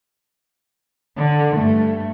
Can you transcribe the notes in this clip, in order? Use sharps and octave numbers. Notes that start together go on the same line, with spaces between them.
D3
G2 A3